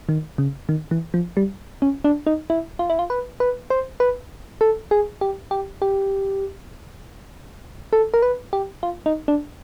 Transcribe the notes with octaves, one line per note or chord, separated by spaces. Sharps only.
D#3
C#3
D#3
E3
F3
G3
C#4
D4
D#4
E4
F4
E4
F4
B4
B4
C5
B4
A4
G#4
G4
G4
G4
A4
A#4
B4
G4
F4
D#4
D4